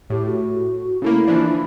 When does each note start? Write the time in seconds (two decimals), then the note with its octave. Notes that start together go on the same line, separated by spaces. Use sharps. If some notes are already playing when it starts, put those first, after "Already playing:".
0.10 A2 G4
0.26 F#4
1.02 C#3 A3 A#3 E4
1.27 E3 F3 D4